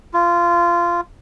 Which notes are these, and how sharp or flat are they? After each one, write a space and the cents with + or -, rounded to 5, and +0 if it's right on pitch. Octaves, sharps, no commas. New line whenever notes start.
F4 -20